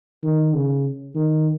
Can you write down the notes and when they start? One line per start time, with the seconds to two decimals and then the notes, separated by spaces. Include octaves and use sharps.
0.23 D#3
0.53 C#3
1.15 D#3